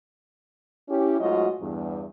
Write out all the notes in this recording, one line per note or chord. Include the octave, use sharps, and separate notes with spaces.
C#4 E4 G4
G#2 F#3 A3 F4 F#4 D#5
E2 G2